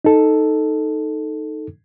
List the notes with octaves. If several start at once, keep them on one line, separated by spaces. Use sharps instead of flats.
D#4 A4